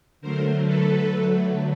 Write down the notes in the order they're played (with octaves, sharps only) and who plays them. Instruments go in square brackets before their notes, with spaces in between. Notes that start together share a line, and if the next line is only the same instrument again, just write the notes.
[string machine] D3 F#3 A3 A#4 C5
A4 B4
D3 F#3 A3